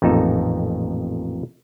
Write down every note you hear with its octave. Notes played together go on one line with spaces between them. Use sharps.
A1 F2 A#2 D#4 A4